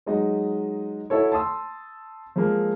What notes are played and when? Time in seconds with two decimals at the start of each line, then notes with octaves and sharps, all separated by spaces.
0.06 F#3 G#3 D#4 D#5
1.10 E4 F#4 A4 C#5
1.32 A5 C6 D#6 E6
2.36 F3 G#3 A#3